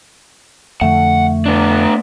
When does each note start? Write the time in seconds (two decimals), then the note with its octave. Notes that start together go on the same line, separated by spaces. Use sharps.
0.81 F2 D3 A3 F#5
1.46 B3 D4